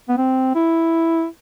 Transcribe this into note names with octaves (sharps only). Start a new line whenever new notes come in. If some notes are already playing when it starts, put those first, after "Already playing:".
B3
C4
E4